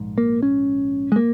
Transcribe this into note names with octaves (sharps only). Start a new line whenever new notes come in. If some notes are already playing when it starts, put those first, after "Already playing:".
Already playing: A#1 G#2
A#3
C#4
G#3
A#3